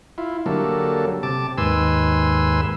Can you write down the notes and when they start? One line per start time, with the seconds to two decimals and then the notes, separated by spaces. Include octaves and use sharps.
0.18 E4 F4
0.46 D3 F#3 G3 A#3 A4
1.23 C3 A5 D6
1.58 D#2 G#2 B4 G#5 C6 E6